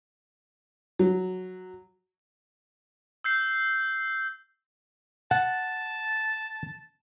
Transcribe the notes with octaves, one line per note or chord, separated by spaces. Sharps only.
F#3
E6 G6 C7
F#5 A5